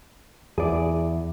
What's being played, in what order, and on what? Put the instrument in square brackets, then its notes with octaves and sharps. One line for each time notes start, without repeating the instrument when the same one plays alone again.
[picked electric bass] E2 [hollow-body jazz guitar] G#4 D5